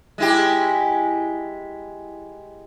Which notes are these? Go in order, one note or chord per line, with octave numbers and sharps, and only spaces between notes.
G#3 E4 G4